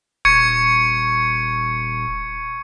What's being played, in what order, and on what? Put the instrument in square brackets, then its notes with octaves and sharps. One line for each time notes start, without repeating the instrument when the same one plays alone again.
[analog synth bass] D#1 [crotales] C#6 G#6 C#7